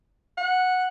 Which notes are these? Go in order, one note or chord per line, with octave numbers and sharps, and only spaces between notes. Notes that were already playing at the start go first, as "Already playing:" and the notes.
F#5